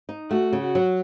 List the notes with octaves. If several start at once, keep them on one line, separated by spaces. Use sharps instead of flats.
D#4
A3 F#4
C#3
F#4
F#3